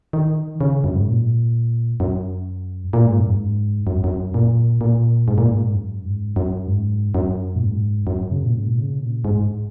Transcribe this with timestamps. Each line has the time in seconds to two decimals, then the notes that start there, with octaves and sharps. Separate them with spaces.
0.13 D#3
0.61 C#3
0.84 F#2
0.95 G#2
1.07 A#2
2.00 F#2
2.93 A#2
3.06 G#2
3.18 F#2
3.29 G#2
3.87 F#2
4.04 F#2
4.34 A#2
4.81 A#2
5.28 G#2
5.38 A#2
5.48 G#2
5.74 F#2
6.05 G#2
6.36 F#2
6.67 G#2
7.15 F#2
7.56 A#2
7.60 G#2
8.07 F#2
8.31 C#3
8.43 A#2
8.54 G#2
8.68 A#2
8.78 C#3
9.00 A#2
9.25 G#2